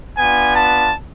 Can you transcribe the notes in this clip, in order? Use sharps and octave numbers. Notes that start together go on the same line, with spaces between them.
B3 D4 F4 G#5
A5